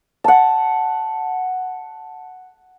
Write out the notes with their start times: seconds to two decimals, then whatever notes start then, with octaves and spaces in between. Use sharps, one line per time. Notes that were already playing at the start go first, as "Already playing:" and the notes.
0.24 F#5 A5